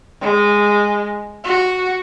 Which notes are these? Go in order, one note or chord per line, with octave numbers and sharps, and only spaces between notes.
G#3
F#4